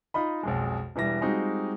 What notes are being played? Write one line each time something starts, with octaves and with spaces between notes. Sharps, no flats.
D#4 F4 D#5 B5
B1 F2 G#3
E1 E3 G3 A#6
G3 G#3 C4 D#4 F4 F#4